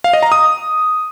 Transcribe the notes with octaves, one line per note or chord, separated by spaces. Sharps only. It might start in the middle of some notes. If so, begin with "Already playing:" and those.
F5
D#5
A#5
D#6